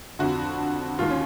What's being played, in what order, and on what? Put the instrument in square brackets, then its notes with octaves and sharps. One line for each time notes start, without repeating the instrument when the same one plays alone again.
[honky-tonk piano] F2 D3 F#4
D#2 D#3 F4
C#4